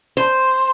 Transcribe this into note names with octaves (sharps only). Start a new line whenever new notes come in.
C5